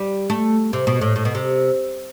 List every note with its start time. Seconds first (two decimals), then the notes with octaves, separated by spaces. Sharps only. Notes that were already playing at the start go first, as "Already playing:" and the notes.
Already playing: G3
0.30 A3
0.73 C3
0.87 B2
1.01 A2
1.16 A2
1.25 B2
1.35 C3